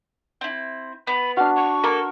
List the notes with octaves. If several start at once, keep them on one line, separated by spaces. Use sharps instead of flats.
C4 E4
B3 B5
D4 F#4 F6
C#6
A#3 A4 A#4